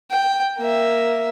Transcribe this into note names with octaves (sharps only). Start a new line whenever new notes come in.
G5
A#3 E5